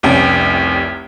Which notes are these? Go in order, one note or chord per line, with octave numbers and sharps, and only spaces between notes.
F1 C2 C#4 G5